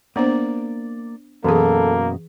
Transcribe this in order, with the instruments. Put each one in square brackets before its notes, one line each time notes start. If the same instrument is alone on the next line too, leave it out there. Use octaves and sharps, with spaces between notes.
[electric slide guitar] A#3 D5 [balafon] B3 D4 C5
[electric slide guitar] F#2 B2 [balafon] E3 G#4 [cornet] A#3 [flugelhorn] A4